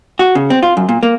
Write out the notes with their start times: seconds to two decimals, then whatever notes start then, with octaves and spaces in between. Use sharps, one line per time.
0.19 F#4
0.35 C#3
0.50 C4
0.63 F4
0.77 F#2
0.89 A#2
1.03 A#3